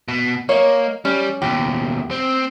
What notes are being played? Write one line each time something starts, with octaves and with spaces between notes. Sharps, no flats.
B2
A#3 C#5 D#5
G3 C#4
D#2 B2 G4
C4